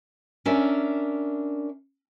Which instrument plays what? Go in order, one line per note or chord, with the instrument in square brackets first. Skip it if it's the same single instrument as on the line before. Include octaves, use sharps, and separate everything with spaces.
[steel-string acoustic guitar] C#4 D4 A#4 E5